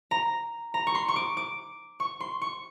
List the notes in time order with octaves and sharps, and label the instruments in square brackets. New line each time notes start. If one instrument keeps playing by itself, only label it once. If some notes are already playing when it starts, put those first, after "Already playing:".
[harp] A#5
A#5
C#6
C6
C#6
D6
D6
C#6
C6
C#6